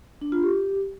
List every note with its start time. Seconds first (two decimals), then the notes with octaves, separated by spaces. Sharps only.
0.21 D4
0.32 F4
0.43 G4